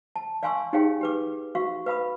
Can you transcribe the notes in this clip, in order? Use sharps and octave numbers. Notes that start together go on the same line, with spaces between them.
A5
D5 F5 G#5 C6 C#6 E6
D#4 G4 G#4 C#5 F5 G5
G4 B4 D6
F#4 F5 C#6
B4 F5 B5 D#6